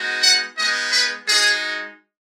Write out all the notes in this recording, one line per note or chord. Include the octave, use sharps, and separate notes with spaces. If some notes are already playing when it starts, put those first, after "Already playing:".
Already playing: G#3 B3 D#4 F#4
F#5
G#3 B3 D#4 D#5
B4
G#3 D#4 F#4 G#4